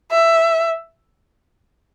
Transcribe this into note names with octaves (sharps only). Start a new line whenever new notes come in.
E5